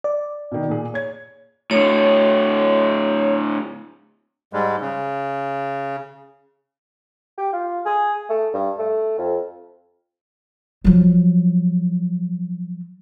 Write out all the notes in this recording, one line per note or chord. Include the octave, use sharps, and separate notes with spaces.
D5
B2 D#3
A#2 G#4
C#5 G#6
A2 D3 C#5
G#2 G3 G#3
C#3
G4
F4
G#4
A3
G2
A3
F2
F3 F#3